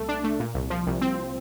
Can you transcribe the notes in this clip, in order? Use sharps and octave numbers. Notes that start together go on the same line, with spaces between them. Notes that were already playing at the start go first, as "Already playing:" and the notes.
Already playing: C2 A#2 A3
D4
A3
A#2
C2
F3
C2
C4